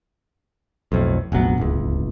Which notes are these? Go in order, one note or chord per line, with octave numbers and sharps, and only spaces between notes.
B1 F2 A2
F1 A#1 F#3 B3
D1 G1 C#2